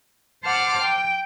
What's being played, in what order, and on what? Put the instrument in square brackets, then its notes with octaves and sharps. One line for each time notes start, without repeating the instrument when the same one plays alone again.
[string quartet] C5 F#5 A5 D6 F6
G5